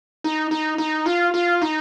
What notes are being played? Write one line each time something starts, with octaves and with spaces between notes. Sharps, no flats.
D#4
D#4
D#4
F4
F4
D#4